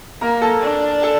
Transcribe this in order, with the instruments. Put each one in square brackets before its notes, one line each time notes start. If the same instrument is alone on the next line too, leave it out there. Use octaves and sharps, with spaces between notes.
[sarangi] A#3 [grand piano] A#4 A#5
[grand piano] A4 A5
[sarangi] D4
[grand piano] A4 A5